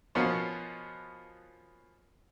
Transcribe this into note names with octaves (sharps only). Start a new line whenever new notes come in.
B2 F3 A#3 B3 C#4 F4